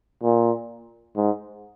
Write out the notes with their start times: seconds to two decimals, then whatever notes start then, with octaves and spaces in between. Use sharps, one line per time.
0.23 A#2
1.16 G#2